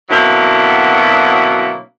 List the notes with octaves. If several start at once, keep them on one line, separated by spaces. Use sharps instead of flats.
B2 D3 F#3 A#3 C4 E4